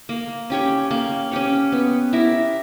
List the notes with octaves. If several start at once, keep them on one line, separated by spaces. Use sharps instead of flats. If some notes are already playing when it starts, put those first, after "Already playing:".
A#3
C#4 G4 C#5
A#3
C#4 G4 C#5
B3
E4 G4 A#4